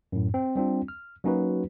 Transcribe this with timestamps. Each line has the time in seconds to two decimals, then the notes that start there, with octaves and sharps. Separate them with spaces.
0.12 F#2 A2
0.34 C4
0.56 G3 C4 D4 F4
0.88 F6
1.24 F#3 A#3 C#4 D#4 F#4 B4